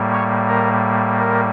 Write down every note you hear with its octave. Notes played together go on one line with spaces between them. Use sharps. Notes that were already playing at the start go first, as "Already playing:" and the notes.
Already playing: A2 G3 A#3
C#5
A#4
A#4